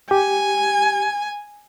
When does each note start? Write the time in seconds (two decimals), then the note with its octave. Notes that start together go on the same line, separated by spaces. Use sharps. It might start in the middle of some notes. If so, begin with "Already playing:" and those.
0.11 G4 G#5